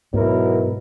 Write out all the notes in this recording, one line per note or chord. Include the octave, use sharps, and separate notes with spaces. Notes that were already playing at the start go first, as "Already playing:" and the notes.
G#2 B2 F#3 E4 A#4